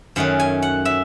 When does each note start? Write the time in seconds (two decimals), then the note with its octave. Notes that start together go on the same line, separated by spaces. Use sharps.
0.16 F#2 D#3 A3 C#4 F#5
0.40 G#5
0.62 F#5
0.85 E5